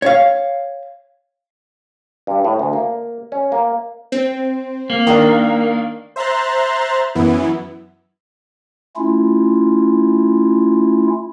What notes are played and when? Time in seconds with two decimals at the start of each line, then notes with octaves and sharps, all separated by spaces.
0.02 C#5 F5
2.27 G2
2.44 A2
2.59 D2
2.73 A#3
3.32 C#4
3.52 A#3
4.12 C4
4.90 A#3
5.07 D#3 D4 A#4
6.16 C5 E5 A#5 C6 F#6 A6
7.15 F#2 E3 B3 E4
8.96 A3 C#4 E4 F4